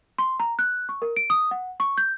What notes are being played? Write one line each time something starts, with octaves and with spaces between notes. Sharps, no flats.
C6
A#5
F#6
C#6
A#4
D7
D#6
F#5
C#6
G6